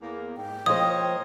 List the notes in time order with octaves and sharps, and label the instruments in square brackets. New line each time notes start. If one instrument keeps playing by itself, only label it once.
[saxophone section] E2 A#3
[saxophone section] G#2 [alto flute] G5
[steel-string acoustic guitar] F3 C5 [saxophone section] A#3 C#5 D#5 [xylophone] D#6